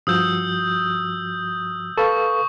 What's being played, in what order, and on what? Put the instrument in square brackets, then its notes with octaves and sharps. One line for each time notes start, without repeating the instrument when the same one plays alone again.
[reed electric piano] G2 F3 F#4 [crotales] D#6 E6 G6
[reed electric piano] A4 B4 F5 [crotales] C#6